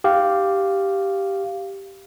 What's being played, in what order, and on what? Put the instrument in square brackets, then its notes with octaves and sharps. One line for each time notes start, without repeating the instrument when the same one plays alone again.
[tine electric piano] G4 F5